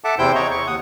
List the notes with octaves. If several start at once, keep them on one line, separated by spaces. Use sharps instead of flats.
A4 E5 F#5 A5 D6
E2 C3 E4 C5 G5 G6
C#5 D#5 A#5 C#6
C#6
D#2 F#5 D#6